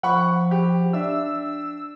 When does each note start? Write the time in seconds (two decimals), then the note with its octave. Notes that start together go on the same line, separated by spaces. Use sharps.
0.03 F3 F#5 B5 C#6
0.51 G4
0.93 D4 E5 E6